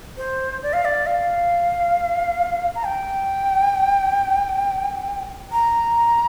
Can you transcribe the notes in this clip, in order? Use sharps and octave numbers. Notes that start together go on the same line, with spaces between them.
C5
D5
F5
D5
F5
A#5
G5
A#5